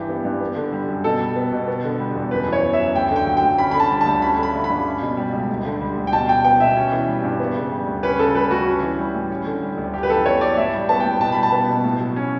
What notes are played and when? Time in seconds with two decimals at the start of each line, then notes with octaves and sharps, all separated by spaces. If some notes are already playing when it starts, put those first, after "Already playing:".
Already playing: G2 E3 G4
0.09 B3
0.25 G2
0.41 B3
0.56 D3
0.72 G3
0.88 F#2
1.04 B2 A4
1.21 G3
1.36 B3
1.52 B2
1.68 B3
1.84 D3
2.00 G3
2.15 E2
2.31 F#2 B4
2.48 E3 C#5
2.63 B3
2.73 E5
2.79 F#2
2.95 D2 G5
3.11 D3
3.16 G5
3.27 F#3
3.37 G5
3.43 D2
3.58 C#4 B5
3.71 D3 B5
3.80 A5
3.90 G3
4.01 A5
4.06 D2
4.22 C#4 B5
4.38 D3
4.43 B5
4.54 A3
4.64 B5
4.70 G2
4.86 C#4
5.01 B2
5.17 G3
5.33 C#2
5.49 D2
5.65 D3
5.81 G3
5.97 D2
6.07 G5
6.12 B2 A5
6.29 G3 G5
6.44 B3 G5
6.60 B2 E5
6.76 C#4
6.92 E3
7.08 G3
7.24 G2
7.40 B3
7.55 C#3
7.71 G3
7.87 D2
8.03 C#4 B4
8.19 C#3 A4
8.35 G3 B4
8.51 D2 F#4
8.66 C#4
8.83 E3
8.99 G3
9.14 A2
9.30 C#4
9.46 D3
9.62 G3
9.78 D2
9.94 F#2 G4
10.03 B4
10.10 E3 A4
10.26 B3 C#5
10.41 F#2 D5
10.57 A2 E5
10.73 G3
10.89 B3 A5
11.00 A2 G5
11.21 B2 A5
11.32 G3 B5
11.43 A5
11.52 B3
11.69 B2
11.85 A2
12.00 F#3
12.16 C#4